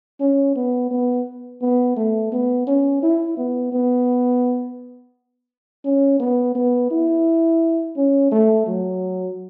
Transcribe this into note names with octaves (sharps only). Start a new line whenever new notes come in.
C#4
B3
B3
B3
A3
B3
C#4
E4
B3
B3
C#4
B3
B3
E4
C#4
A3
F#3